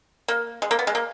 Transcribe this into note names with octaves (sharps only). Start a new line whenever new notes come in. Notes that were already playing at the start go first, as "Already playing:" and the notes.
A#3
G#3
A#3
B3
G#3
A#3